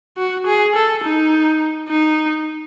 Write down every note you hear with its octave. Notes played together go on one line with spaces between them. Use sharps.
F#4
G#4
A4
D#4
D#4